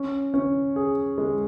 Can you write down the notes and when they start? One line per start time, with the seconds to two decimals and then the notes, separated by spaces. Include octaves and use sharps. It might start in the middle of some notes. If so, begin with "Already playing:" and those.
Already playing: C#4
0.34 C#4
0.76 G#4
1.18 G#3